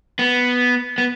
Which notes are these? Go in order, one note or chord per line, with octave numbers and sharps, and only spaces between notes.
B3
B3